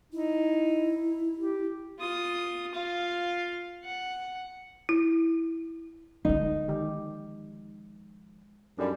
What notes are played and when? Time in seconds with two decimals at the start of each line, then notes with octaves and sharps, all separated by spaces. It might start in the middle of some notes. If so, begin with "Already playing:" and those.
0.12 D#4 E4
1.36 G4
1.99 F4 D#6
2.74 F4 F5
3.85 F#5
4.89 E4
6.25 D3 F3 G#3 B3 D#4 A4
6.69 D#3 G4
8.79 F#2 G3 D4 D#4 A4